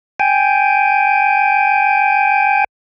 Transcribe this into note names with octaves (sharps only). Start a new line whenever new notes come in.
G5 G#5